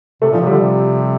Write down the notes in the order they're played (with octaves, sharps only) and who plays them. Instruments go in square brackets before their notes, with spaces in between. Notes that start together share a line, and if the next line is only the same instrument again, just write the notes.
[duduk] C3 [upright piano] A3
[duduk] A#2 [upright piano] F3
[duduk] C3
[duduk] D3 [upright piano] G3
[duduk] C3